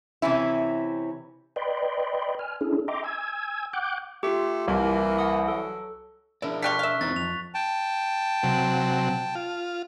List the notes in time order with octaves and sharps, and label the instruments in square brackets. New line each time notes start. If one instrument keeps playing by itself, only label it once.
[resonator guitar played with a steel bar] C3 E3 C#4 E4
[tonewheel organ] B4 D5 D#5 G5 B5 C6
G#5 F6
C#4 D4 E4 G#4 A4
D#5 E5 G5 A#5 C6 D6
G#5 E6 G#6
F#5 G5 D6 F#6 G6
[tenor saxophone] A3 [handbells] F4 G4
[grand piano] C2 [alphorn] E3 [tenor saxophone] A#3
[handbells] F#5 D#6
[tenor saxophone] F#3 [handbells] A4
[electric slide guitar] D4 A#4 D5 [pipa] E4
[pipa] D3 G3 F5 [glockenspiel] C#6 F#6 B6
[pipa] E5 F5
[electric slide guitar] E2 C4 D#4 [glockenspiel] A6
[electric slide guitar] F2 [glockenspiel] F7
[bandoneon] G5 A5
[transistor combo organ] C3 F#3
F4